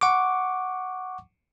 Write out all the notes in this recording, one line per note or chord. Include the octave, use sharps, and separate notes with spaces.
F#5 C#6 D6